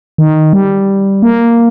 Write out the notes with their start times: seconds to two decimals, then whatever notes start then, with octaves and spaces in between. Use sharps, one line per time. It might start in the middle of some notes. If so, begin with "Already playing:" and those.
0.18 D#3
0.53 G3
1.23 A#3